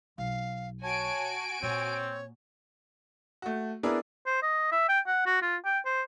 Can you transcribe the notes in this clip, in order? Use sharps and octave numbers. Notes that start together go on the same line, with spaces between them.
B1 F5
F#4 C#5 G#5 A5 D7
A#2 C4 C#5
A3 F#4
B3 D4 E4 G#4 A#4 D5
C5
D#5
E5
G5
F#5
F#4
F4
G5
C5